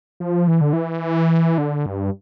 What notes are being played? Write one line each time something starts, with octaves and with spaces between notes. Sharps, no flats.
F3
E3
D3
E3
D3
G2